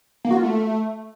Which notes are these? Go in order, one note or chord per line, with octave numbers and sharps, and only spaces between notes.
A#3
F#4
F4
A3